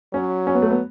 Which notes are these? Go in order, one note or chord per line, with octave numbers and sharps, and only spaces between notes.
F#3 C#4
C#4
B3
A3
B3